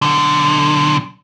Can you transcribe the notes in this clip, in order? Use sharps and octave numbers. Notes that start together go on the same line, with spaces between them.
B1 D3